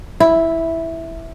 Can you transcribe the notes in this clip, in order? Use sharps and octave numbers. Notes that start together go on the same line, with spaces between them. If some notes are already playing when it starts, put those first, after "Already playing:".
E4